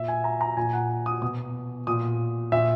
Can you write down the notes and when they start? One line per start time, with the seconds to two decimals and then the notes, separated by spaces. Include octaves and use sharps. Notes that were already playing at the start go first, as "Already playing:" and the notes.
Already playing: A#2 E5
0.08 G#5
0.24 A#5
0.41 A#5
0.57 A#2 G#5
0.73 F#5
1.06 D#6
1.22 B2 D#6
1.87 A#2 D#6
2.52 A#2 E5